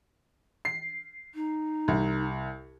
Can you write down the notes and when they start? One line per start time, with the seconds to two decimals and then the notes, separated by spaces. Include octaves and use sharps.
0.65 C7
1.35 D#4
1.88 C2